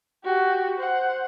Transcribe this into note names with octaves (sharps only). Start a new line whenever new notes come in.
F#4 G4
C5 F#5